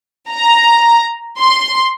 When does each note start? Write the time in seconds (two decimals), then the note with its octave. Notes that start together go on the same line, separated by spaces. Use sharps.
0.29 A#5
1.38 C6